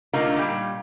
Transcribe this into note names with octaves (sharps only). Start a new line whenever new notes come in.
D3 A3 A#3 D#4 F4 A#4
A#2 G3